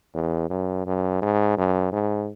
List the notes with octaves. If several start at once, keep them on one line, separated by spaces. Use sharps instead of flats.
E2
F#2
F#2
G#2
F#2
G#2